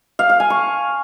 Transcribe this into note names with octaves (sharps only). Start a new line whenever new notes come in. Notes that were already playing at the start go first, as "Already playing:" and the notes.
F5
F5
G#5
C#6